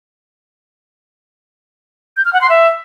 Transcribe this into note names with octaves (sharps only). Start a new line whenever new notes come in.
G6
F6
F#5
C6
E5